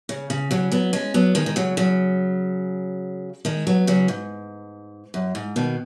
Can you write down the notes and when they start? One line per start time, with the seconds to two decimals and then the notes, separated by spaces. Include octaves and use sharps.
0.09 C#3
0.30 C#3
0.51 C#3 F#3
0.72 F#3 B3
0.93 G#3 C#4
1.14 F#3 B3
1.35 D#3 G#3
1.46 D#3
1.56 C#3 F#3
1.77 C#3 F#3
3.45 D#3 G#3
3.67 F#3 B3
3.87 C#3 F#3
4.08 G#2
5.14 F#2
5.35 G#2
5.56 B2 D#3